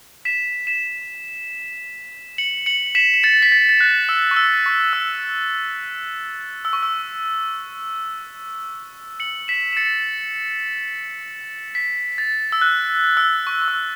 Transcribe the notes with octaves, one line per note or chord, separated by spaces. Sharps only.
B6 E7
B6 E7
C#7 F#7
C#7 F#7
B6 E7
E7
A6 C#7
B6
A6
A6
F#6
E6
C#6
E6
C#6
E6
E6
C#6
E6
C#7 F#7
B6 E7
E7
A6 C#7
B6
A6
E6
F#6
E6
C#6
C#6
E6